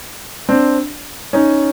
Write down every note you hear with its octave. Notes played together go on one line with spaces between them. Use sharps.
C4 D4
C#4 D#4